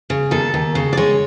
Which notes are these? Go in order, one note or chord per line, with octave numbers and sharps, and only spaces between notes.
C#3
D#2 A4
D#2
C#3
D5
G#3 C#5